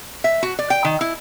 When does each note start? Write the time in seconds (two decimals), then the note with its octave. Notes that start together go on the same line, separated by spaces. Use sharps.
0.24 E5
0.43 F#4
0.59 D5
0.70 G5
0.85 D#3
1.01 E4